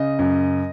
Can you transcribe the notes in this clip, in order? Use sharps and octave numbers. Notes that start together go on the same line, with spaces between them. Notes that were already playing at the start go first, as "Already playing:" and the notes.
Already playing: C#3 D#5
F#2